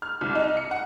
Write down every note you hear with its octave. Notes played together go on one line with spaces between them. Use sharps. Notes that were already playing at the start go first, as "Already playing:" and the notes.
F6
C2
D#4
C#7
F#5